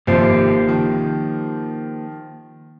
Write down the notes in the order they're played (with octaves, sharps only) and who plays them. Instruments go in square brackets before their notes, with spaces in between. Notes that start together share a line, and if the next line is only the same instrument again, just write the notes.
[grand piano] G#1 C3 F3 [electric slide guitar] A#3 G4 C5
[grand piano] D#3 F3